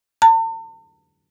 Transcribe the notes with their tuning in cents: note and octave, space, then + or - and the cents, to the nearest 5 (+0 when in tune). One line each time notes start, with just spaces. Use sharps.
A5 +45